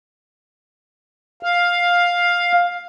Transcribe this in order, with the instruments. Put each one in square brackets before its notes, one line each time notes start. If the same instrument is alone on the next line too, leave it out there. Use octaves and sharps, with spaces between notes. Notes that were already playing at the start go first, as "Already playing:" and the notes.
[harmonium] F5